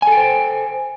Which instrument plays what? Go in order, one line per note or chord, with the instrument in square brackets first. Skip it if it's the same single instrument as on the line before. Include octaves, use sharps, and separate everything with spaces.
[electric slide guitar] G#5
A4
G5
C5